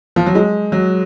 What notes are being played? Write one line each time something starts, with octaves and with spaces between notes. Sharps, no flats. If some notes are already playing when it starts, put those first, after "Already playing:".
F3
F#3
G#3
F#3